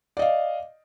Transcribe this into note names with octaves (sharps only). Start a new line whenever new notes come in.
D5 D#5 F5